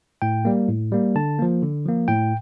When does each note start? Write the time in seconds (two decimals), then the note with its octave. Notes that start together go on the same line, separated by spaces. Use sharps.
0.22 A2 G5
0.45 G3 A#3
0.69 A2
0.92 G3 A#3
1.15 D3 A5
1.39 F3 A#3
1.62 D3
1.86 F3 A#3
2.08 A2 G5